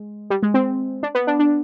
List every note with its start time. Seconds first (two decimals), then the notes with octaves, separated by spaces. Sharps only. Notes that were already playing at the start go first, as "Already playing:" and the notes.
Already playing: G#3
0.30 G3
0.43 G#3
0.54 C4
1.03 D4
1.15 B3
1.27 D4
1.39 D4